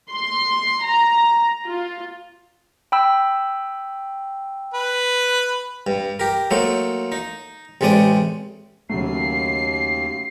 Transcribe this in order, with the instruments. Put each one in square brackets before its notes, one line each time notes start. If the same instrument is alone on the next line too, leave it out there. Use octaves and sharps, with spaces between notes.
[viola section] C6
A#5
F4
[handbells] G5 B5 E6
[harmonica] B4
[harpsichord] G2
G4 A#4
F#3 A3 A#3 C5
D#4
A1 C3 G#3 D5 D#6
[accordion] D#2 [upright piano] C#3 F#3 A3 [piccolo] C7